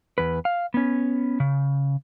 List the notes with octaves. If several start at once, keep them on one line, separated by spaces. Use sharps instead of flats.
E2 B4
F5
B3 C#4
C#3